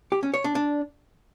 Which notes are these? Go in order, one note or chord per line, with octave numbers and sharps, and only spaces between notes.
G4
C#4
C#5
D4
D4